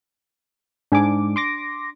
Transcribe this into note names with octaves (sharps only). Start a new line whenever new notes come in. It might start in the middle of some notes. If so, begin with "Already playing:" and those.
G#2 D4 G#5 D6
C6 D6 A#6